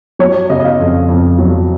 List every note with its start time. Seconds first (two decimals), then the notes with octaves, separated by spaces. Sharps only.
0.19 F#3 C#5
0.35 C#5
0.50 C#3 D#5
0.60 D#5
0.64 F5
0.80 F2
1.09 F2
1.39 F#3